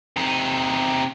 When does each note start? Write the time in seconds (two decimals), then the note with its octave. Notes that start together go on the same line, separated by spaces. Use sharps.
0.17 C3 D#4